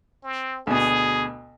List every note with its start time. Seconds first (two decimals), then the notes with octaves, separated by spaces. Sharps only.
0.24 C4
0.67 D2 B2 G#4